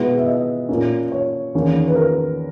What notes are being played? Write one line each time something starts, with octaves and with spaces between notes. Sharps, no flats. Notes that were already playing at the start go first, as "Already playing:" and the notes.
Already playing: B2 G#3 B3 E4 B4
E5
D#5
A#2 A#3 C#4
C#5
E2 D#3 A#3 C#4
B4
A#4